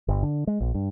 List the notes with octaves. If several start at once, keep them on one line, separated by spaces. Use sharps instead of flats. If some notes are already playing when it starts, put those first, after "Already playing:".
G1
D3
G#3
A#1
G2